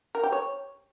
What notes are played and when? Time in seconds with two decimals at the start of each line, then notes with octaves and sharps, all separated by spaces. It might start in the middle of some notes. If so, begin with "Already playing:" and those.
0.15 A#4
0.24 G4
0.32 C#5